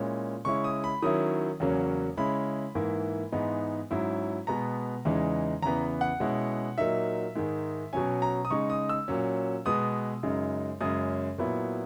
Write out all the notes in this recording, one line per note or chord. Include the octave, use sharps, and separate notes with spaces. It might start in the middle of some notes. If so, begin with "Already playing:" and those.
Already playing: A#2 G#3 C#4 E4
C#3 G#3 C#4 E4 C#6
D#6
B5
D#3 F#3 C#4 E4 D#6
E2 C#3 F#3 A#3 C#4
C#3 G#3 C#4 E4 B5
G#2 E3 A#3 E4
G#2 E3 G#3 B3 D#4
G#2 F#3 C#4 E4
B2 G#3 B3 A#5
E2 C#3 E3 G#3 D#4
E2 C#3 E3 B3 A#5
F#5
B2 G#3 C#4 E4
A#2 F#3 A#3 D#4 E5
G#2 D#3 G#3
B2 F#3 C#4 G#5
A#5
D#6
C#3 G#3 D#4 C#6
D#6
E6
A#2 F#3 C#4
B2 G#3 B3 D#6
F#2 C#3 G#3 D#4
F#2 C#3 G#3 C#4 D#6
A#2 F#3 B3 E4